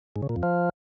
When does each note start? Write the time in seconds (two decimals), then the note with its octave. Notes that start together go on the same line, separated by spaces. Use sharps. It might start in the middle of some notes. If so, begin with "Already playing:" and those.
0.16 G#2
0.22 C#3
0.29 A#2
0.36 F2
0.43 F3